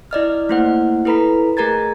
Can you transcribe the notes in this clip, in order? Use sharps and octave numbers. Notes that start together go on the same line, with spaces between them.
E4 D5 D#5 F6
A3 A#3 E4 C5 F#5
E4 A4 B4 A#5 B5 B6
A3 G#4 A#4 A#5 G#6 A6